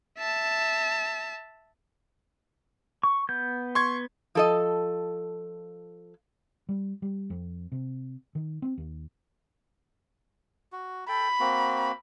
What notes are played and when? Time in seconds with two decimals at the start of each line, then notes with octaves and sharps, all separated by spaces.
0.18 E5 A5
3.03 C#6
3.29 B3 G6
3.75 C6 C#6 G#6
4.35 F3 A4 D#5
6.69 G3
7.02 G3
7.30 F2
7.72 C3
8.35 D#3
8.62 C4
8.78 D#2
10.72 F#4
11.08 A4 G5 B5
11.40 A#3 C4 F#4